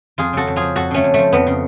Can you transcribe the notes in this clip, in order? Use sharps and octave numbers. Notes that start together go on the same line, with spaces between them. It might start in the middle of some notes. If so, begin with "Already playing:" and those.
F2 F4 G#4
C#3 F#4 A4
F2
F3 F4 G#4
F2 F#4 A4
C#3 A3 C#4
F2
F3 A3
F2 B3
C#3